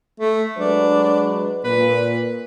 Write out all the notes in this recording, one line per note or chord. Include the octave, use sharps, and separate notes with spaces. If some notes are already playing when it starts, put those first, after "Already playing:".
A3
F#3 G#3 D4 B4
A#2 B4